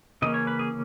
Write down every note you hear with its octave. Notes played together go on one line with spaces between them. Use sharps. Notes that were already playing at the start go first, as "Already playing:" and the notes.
C#3 E3 A#3 C#4 D#5
C#5
B4
G#4